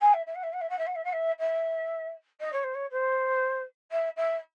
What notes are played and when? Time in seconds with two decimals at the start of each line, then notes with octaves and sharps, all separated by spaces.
0.01 G#5
0.13 E5
0.26 E5
0.35 F#5
0.43 E5
0.52 F#5
0.61 E5
0.69 F#5
0.78 E5
0.86 F#5
0.95 E5
1.04 F#5
1.12 E5
1.39 E5
2.40 D#5
2.52 C#5
2.63 C5
2.74 C#5
2.91 C5
3.91 E5
4.16 E5